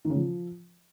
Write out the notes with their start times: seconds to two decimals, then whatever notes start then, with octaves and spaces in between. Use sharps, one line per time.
0.05 D#3
0.10 C#3
0.15 F3